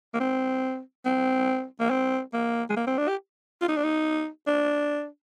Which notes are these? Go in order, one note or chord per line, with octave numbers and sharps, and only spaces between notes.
A#3
C4
C4
A#3
C4
A#3
G#3
A#3
C4
D4
G4
F4
D#4
D4
D#4
D4